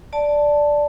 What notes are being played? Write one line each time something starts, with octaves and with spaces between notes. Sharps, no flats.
D5 A5